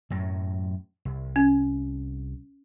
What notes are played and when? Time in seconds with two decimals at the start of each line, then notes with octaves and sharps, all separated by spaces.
0.10 F#2 A2 F#3
1.05 C2
1.36 C#4